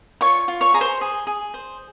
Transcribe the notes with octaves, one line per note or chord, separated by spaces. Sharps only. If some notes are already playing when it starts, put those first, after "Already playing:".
F4 C#5 C#6
F4
C#5 C#6
G#4 A#5
C5 C6
G#4
G#4
C5